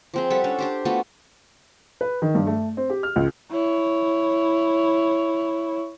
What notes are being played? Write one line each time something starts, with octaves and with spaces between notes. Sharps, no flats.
F3 C4 G#4
G3 A4 F#5 B5
C#4 D4
D4 G4 C5
A3 B3 F4 F#4
B4
D#3
G2
A3
C4
G4
F6
C#2
E4 C#5